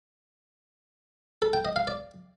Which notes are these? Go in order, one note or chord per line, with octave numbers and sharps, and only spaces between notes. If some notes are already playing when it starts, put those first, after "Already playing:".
A4
G5
D#5
F5
D5